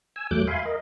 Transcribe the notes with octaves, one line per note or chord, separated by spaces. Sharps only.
G#5 E6
E2 F#3 A3 D6 F#6 G6
E5 F5 G#5 B5 C6
A#4 D#5